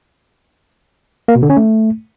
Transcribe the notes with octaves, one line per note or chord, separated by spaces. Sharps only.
A#3
B2
D3
C#4
A3